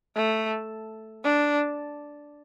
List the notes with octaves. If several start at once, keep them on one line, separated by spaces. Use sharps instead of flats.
A3
D4